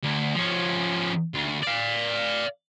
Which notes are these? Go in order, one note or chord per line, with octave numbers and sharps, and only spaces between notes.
D2
F3 C#4
D2
D5 F5